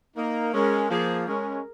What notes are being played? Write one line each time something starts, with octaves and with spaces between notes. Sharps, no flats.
A#3 D#4 A#4
G#3 C#4 A#4
F3 A#3 G#4
G#3 C#4 A#4